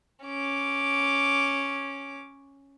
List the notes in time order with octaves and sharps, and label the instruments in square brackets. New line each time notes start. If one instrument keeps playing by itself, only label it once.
[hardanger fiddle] C#4 D6